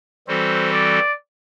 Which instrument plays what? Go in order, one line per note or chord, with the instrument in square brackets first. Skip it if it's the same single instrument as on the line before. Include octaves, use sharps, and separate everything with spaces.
[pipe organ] E3 G3 C4 F#4 A4 [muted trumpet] C5
[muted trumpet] D5